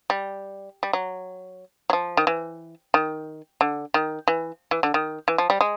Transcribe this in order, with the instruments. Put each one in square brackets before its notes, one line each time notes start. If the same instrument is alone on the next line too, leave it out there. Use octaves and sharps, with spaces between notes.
[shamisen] G3
G3
F#3
F#3
F3
D#3
E3
D#3
D3
D#3
E3
E3
D3
D#3
E3
F3
G3
G#3